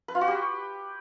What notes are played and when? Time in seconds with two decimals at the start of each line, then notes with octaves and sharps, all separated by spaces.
0.08 B4
0.15 F4
0.21 F#4
0.28 G4